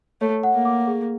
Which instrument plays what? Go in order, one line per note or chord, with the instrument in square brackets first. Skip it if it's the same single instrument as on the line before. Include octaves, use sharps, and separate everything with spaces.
[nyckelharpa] A3 [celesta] C#5
[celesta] F#5
[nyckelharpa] A#3
[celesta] D6
G#4